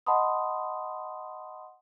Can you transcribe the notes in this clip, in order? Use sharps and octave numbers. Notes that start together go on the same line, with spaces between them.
D#5 F#5 A5 B5 C6 D#6